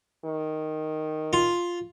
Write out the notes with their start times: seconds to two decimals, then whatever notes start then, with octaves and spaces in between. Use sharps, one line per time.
0.24 D#3
1.33 F4